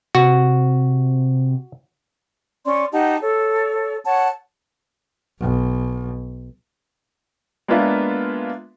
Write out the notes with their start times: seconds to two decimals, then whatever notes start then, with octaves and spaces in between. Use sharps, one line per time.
0.15 C3 F#4
2.65 C#4 D5 C6
2.92 D#4 G4 F#5 A5
3.21 A4 C#5
4.04 C#5 F#5 A5
5.40 B1
7.68 G#3 A#3 B3 D4 F4 E5